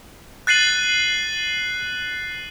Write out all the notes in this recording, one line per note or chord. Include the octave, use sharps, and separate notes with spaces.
F#6 A6 C7 D#7 F#7